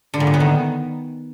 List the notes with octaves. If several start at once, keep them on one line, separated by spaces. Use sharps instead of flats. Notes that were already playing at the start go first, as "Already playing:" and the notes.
D3
A#2
A2
B3
D#3